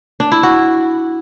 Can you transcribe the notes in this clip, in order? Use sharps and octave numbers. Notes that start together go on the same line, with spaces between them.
D4
E4
F#4